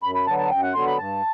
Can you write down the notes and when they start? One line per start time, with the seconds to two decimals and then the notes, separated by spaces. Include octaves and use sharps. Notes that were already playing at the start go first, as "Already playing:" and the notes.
0.03 F#2 B5
0.15 B5
0.27 D3 F#3 B3 A5
0.38 A5
0.50 F#2 G5
0.63 F#5
0.74 D3 F#3 B3 C6
0.86 B5
0.98 G2 A5